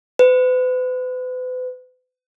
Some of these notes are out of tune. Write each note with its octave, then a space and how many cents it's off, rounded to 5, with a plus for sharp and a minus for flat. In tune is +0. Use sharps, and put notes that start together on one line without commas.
B4 +40